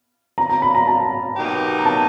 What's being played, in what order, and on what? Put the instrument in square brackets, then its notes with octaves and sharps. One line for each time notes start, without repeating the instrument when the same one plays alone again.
[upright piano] A#5
A#5
B5
A#5
A5
[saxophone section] B2 F#3 A#3 D#4 G4
[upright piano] A#5
A5